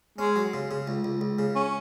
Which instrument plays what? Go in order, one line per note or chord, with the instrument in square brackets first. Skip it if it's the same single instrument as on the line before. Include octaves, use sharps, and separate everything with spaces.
[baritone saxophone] G#3 [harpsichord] C#4
[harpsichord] F#3
C#3
C#3
C#2
C#2
C#2
C#3
[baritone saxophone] C#4